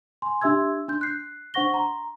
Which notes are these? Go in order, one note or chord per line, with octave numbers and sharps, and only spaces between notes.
G#5 C6
D4 G4 E5 C6 E6 G#6
D4 C6 G6
F#6 C7
D4 C5 F#5 C#6 A#6 G7
A#5 C6